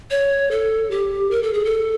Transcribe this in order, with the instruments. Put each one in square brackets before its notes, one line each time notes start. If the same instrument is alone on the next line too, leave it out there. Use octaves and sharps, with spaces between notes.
[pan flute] C#5
A4
G4
A#4
A4
G#4
A4